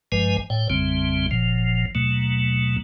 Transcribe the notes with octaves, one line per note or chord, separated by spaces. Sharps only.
G#1 G2 F3 G#3 B4 G#5
A2 C#5 G5
A1 F2 C#3 G3 C4
F#1 A#2 F3
D#2 B2 F#3 A3